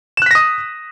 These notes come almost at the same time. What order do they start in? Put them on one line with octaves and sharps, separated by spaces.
E7 F#6 B6 A#6 D#6